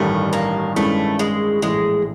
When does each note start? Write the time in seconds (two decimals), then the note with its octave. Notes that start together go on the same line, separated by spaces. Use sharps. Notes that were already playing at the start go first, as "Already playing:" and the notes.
Already playing: A1 G2 D#3 G3 A3
0.33 A#3
0.76 G2 D#3 G#3 A3 C#4 E4
1.19 G#3
1.62 A#1 A2 E3 G#3